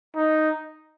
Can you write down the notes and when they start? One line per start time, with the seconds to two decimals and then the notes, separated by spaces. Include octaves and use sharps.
0.16 D#4